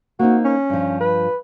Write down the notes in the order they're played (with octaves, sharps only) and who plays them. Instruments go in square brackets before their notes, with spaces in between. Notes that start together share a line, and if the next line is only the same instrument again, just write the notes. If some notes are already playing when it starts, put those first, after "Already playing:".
[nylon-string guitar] A#3 C4 D#4 [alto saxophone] F#4
[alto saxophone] C#4
[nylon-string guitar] G2 F3
[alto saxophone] B4